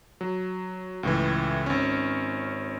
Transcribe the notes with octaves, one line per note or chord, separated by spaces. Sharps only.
F#3
C#2 A2 E3
G#1 C#4